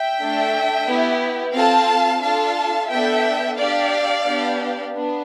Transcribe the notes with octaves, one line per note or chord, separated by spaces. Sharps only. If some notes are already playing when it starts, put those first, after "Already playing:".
Already playing: E5 G5
A3 D4 A4
B3 E4 G4
C4 F4 A4 F5 A5
D4 F4 A4 F5 A5
B3 D4 A4 E5 G5
D4 G4 D5 F5
B3 D4 G4
B3 D4